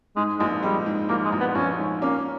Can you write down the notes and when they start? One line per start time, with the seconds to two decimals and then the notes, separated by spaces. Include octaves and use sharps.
0.16 G#2 G#3
0.39 A#1 G#3
0.63 G3 G#3
0.86 G#2
1.09 A#1 A#3
1.25 G#3
1.32 A#1
1.40 B3
1.55 A#1 C#4
1.79 G#2
2.01 A#3 C#4